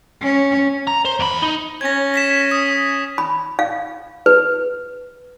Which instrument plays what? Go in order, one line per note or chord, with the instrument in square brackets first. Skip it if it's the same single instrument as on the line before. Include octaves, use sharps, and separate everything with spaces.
[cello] C#4
[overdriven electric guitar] A#5
C5
E2 B5
D#4
[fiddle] C#4 [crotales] G#6 A#6
[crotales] A#6 B6 E7
D#6
[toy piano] B5
F5
B4